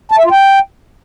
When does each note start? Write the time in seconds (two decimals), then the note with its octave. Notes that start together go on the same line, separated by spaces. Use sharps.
0.12 A5
0.18 E5
0.25 F4
0.31 G5